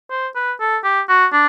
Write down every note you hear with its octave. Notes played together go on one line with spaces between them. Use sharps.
C5
B4
A4
G4
F#4
D4